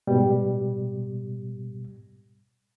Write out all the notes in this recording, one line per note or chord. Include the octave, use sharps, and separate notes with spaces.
G#2 B2 G3